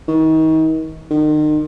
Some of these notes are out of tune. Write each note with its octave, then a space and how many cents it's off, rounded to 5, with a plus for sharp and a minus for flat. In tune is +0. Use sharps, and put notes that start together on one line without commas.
D#3 +35
D#3 -35